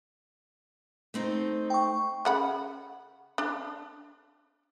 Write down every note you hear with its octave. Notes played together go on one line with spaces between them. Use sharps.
A3 C4 D#4
G5 C#6
C#3 F#5 B5
D4